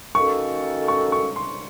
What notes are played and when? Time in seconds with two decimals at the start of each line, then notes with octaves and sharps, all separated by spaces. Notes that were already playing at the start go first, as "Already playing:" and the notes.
0.15 D#3 A#3 C#4 F#4 A4 C#6
0.88 C#6
1.12 C#6
1.36 C6